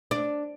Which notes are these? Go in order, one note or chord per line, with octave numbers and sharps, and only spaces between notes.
D4